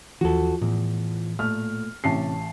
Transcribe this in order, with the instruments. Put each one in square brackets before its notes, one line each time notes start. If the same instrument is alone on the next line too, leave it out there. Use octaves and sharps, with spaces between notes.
[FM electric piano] D#2 E3 [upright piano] F3 [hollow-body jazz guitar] F#4 A4
[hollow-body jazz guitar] E2 [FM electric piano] A2
[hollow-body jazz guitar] A#2 A3 [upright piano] F6
[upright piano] A1 A5 C7 [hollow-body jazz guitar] C3 C#4